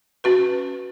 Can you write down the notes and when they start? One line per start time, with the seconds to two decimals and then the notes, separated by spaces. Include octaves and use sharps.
0.24 C#4 F#4 B4